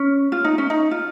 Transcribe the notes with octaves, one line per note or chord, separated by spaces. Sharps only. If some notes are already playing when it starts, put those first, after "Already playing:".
Already playing: C#4
F4
D#4
C#4
D#4
F4